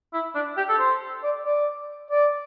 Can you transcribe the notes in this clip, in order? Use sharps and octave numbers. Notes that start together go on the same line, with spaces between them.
E4
D4
G4
A4
C5
D5
D5
D5